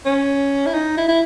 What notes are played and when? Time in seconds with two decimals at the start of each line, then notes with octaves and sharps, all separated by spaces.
0.05 C#4
0.66 E4
0.74 D#4
0.97 E4
1.08 E4